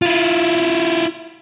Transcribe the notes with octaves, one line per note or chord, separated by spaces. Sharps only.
E4 F4